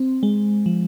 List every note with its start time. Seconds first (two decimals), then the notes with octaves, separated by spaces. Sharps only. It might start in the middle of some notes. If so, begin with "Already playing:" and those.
Already playing: C4
0.23 G#3
0.66 F3